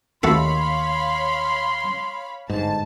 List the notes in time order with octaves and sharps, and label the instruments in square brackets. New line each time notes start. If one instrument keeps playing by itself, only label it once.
[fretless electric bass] D#2 [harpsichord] A3 F#4 A4 [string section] C#5 F5 B5 [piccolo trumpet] C6
[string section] G1 A5 [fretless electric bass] G#2